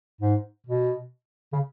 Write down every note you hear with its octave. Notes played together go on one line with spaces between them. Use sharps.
G#2
B2
C#3